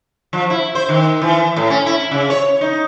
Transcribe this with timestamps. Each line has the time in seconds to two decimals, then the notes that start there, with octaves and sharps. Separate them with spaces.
0.33 F3
0.50 E4
0.75 C5
0.89 D#3
1.21 E3
1.56 A2
1.70 C#4
1.86 E4
2.11 C#3
2.30 C#5
2.61 D#4